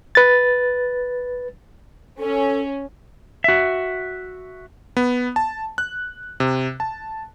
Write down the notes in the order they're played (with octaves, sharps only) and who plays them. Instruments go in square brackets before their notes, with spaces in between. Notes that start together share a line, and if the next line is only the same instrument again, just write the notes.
[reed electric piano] B4 A6
[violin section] C#4 [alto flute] A4
[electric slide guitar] F#4 E5
[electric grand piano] B3
A5
F#6
C3
A5